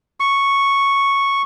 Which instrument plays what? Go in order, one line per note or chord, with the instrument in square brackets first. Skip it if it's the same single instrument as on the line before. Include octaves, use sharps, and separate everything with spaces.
[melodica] C#6